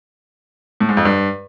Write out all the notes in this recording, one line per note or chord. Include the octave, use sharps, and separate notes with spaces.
A2
G#2
F2
G2